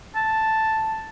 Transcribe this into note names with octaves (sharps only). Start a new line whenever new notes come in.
A5